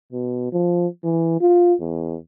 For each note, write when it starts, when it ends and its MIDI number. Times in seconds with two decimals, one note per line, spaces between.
0.12 0.49 47
0.52 0.87 53
1.04 1.39 52
1.41 1.74 65
1.81 2.17 40